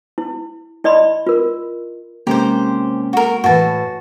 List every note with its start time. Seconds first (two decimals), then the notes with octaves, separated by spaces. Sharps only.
0.18 E4
0.84 E4 D5 D#5 B5 C6
1.27 F4 A#4
2.27 C3 G#3 A#3 C#4 G4 C5 A#5
3.13 F#4 A#4
3.44 A2 E3 F#4 A5